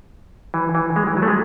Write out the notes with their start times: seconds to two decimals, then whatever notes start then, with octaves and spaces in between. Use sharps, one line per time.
0.54 E3
0.75 E3
0.96 G#3
1.07 E3
1.17 F#3
1.22 A3
1.28 G#3